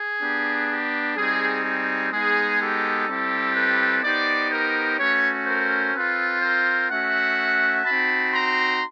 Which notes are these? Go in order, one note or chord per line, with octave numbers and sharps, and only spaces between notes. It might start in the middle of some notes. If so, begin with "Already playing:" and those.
Already playing: G#4
B3 D4 G4
G4
G3 C4 D#4 G#4
G#4
G#3 B3 D#4 G#4
G4 A4
G3 C4 E4 G4
A4 B4
B3 D#4 G4 C5 D5
A#4 C5
A3 C#4 F#4 B4 C#5
A#4 C5
C4 F4 A4 B4
A#4 C5
A3 C#4 F#4 E5 F#5
C4 D#4 F#4 A5 B5
A#5 C6